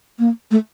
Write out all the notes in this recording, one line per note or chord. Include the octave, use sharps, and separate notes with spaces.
A#3
A3